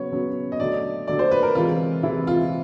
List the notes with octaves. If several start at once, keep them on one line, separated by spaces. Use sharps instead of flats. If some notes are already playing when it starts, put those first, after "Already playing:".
Already playing: C#3 F#3 B3 C#5
C#3 F#3 B3
D#5
D3 F#3 A3 D5
D3 F#3 A3 D5
C5
B4
A#4
C3 E3 G#3 F4
C3 E3 G#3 E4
F4